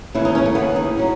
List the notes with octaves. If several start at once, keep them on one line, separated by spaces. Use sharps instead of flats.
D#2 C#3 E3 E4
D#4
C#4
A3
D#2 C#3 E3 B3
D#4
C#3 F#3